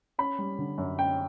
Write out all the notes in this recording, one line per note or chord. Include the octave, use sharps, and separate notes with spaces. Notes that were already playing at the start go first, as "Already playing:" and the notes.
C#4 B5
G3
D3
F#2
C#4 G5